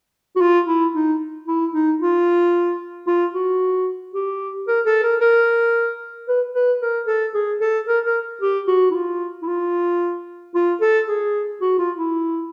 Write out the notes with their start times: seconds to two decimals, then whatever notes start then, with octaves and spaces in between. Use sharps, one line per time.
0.36 F#4
0.41 F4
0.67 E4
0.95 D#4
1.47 E4
1.74 D#4
2.01 F4
3.07 F4
3.34 F#4
4.14 G4
4.68 A#4
4.86 A4
5.03 A#4
5.21 A#4
6.28 B4
6.55 B4
6.82 A#4
7.07 A4
7.34 G#4
7.61 A4
7.87 A#4
8.05 A#4
8.41 G4
8.67 F#4
8.90 E4
8.95 F4
9.42 E4
9.48 F4
10.55 F4
10.81 A4
11.08 G#4
11.62 F#4
11.79 F4
11.96 E4